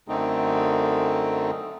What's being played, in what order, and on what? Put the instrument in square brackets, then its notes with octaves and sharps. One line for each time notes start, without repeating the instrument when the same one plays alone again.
[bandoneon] F#2 D3 A3 C4 D#4